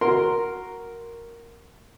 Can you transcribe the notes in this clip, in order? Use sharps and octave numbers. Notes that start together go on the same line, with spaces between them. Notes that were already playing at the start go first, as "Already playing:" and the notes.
F#4 A#4 C6